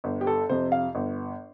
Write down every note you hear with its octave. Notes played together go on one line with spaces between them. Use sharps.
G1
G4
A4
F2 C3 C5
F5
G1